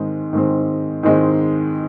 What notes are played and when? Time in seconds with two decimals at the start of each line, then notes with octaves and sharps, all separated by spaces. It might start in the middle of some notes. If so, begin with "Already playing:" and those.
Already playing: G#2 D#3 G#3 C4
0.33 G#2 D#3 G#3 C4
1.03 G#2 D#3 G#3 C4